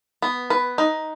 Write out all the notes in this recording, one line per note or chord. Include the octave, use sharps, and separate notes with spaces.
B3
B4
D#4